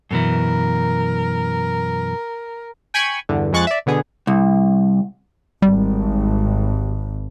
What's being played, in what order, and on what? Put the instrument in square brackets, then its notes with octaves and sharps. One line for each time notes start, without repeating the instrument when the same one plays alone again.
[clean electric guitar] F#2 B2 E3 [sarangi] A#4
[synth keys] G5 G#5 B5 C#6 G#6
E2 G2 D3
F2 G#3 C#6 F#6 A6
D5 E5
B2 D3 B3 G#4
[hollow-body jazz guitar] C2
[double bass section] G#1 [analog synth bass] G3